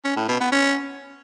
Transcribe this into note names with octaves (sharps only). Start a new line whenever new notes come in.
C#4
A2
B2
B3
C#4